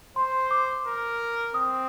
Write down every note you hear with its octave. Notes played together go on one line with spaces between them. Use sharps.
C5 C6
D6
A#4
C4 D#6